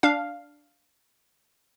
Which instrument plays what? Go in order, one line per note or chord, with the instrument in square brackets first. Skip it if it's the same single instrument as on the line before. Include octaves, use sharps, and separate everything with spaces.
[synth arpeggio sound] D4 F5